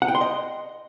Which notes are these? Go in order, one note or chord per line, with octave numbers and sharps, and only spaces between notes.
F#5
G5
C6
D#5